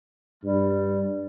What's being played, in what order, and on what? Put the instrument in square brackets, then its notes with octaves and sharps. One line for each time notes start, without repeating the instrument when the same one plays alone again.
[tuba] G2 [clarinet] G3